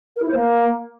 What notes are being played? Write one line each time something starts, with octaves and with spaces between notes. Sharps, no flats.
A#4
E4
C5
A#3